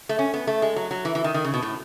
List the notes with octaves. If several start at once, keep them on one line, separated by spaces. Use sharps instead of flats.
A3
C#4
B3
A3
G#3
F#3
F#3
E3
E3
D#3
D#3
C#3
B2
A2